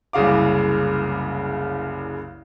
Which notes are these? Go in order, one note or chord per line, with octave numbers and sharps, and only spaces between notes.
F#1 C2 C#3 F5 D6